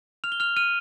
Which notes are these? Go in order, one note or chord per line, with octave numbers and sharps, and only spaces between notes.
F6 F7
G7
F6 F7
F6 D#7